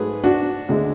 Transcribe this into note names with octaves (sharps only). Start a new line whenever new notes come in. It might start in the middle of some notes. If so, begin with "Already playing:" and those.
Already playing: G#2 F#3 A3 G#4 B4
D4 F#4
D2 D3 G#3